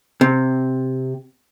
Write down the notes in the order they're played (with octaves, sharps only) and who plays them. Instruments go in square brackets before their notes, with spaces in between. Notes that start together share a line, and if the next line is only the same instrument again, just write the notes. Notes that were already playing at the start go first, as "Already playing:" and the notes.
[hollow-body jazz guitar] C3